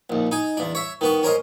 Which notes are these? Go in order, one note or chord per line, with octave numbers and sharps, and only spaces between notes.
A#1 D#2
D#4 G#5
E2 D4
C#5 E5
D#3 B3 C#6
C#4 A#4 C5 D#5